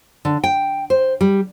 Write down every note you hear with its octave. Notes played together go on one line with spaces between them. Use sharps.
D3
G5
C5
G3